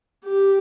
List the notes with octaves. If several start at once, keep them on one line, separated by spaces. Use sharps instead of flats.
G4